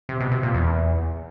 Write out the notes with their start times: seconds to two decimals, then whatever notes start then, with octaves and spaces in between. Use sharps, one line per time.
0.09 C3
0.20 B2
0.32 C3
0.43 A#2
0.55 E2